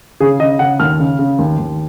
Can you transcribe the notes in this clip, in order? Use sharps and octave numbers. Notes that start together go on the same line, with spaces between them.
C#3 G#4
C#3 D#5
C#3 F#5
D#2 F6
C#3
C#3
D#2
D#2